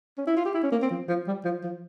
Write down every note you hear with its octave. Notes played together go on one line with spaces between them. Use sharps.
C#4
E4
F4
G4
E4
C#4
A#3
C4
F3
F3
G3
F3
F3